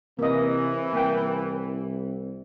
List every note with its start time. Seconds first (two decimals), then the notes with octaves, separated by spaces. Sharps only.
0.19 C3 E3 A#3 D#5
0.93 C2 A#3 G5